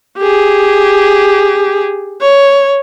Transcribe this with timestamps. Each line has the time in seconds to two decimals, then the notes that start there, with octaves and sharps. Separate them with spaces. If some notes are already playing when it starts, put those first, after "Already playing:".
0.18 G4 G#4
2.21 C#5